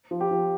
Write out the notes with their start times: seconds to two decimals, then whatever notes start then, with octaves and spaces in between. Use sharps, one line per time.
0.11 F3
0.21 G4
0.31 F3